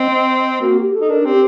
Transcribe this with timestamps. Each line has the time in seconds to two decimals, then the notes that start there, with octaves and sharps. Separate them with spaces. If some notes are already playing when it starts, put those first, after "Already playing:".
Already playing: C4 D#5
0.61 A#3 F#4
0.77 G4
0.94 A4
1.01 D#4
1.10 D4 A#4
1.25 C4 G4